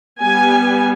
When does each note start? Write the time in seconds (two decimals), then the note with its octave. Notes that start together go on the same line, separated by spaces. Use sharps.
0.20 G3 B3 G#5